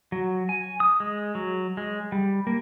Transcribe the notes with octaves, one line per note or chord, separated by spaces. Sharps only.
F#3
G#5
D#6
G#3
F#3
G#3
G3
A#3